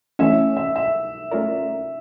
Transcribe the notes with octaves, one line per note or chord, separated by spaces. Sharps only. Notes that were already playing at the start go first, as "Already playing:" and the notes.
E3 A3 C#4 E5
E5
E5
A3 C#4 F4 A#4 D5